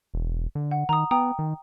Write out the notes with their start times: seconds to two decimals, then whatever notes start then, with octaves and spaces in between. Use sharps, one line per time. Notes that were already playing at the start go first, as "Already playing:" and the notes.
0.14 E1
0.55 D3
0.71 F#5
0.89 D#3 A#5 D#6
1.11 B3 G5 A#5 D#6
1.39 D#3